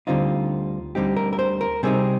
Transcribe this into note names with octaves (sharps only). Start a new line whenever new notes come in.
D2 D3 G3 C4 D#4 F4
D2 D3 G3 C4 D#4 G4
A#4
A#4
C5
A#4
C3 G3 C4 D#4 G#4